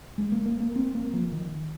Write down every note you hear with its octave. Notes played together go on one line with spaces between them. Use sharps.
G#3
A#3
A#3
A#3
C4
A#3
F3
D#3